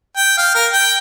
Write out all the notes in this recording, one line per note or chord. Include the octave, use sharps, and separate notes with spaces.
G5
F5
A#4
G5